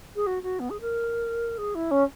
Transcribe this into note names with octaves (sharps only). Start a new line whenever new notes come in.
G#4
F#4
F#4
B3
G#4
A#4
G#4
E4
C#4